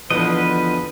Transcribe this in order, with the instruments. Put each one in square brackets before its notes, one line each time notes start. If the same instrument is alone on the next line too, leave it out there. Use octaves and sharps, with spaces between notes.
[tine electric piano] E2 D3 [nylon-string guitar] F3 [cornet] B4 [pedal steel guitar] D#5